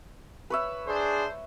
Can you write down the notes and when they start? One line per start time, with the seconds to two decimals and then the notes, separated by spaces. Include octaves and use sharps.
0.50 B4 C#5 E5
0.87 D4 G#4 C5